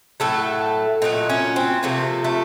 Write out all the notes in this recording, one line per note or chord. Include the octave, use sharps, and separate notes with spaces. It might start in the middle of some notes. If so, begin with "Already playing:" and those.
A2 F#3 A3 A4
A#2 F#3 A3 D#4
C#4
C4
C3 F3 A3 A#3
A3